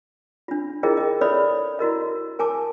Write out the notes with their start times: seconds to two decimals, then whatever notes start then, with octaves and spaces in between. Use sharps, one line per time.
0.48 D4 F4
0.83 E4 F4 G#4 A#4 D#5 G5
0.97 A#4 D#5
1.21 A4 B4 C#5 D5 E5 B5
1.79 E4 F#4 A#4 D#5
2.39 A#4 G#5 A5 D6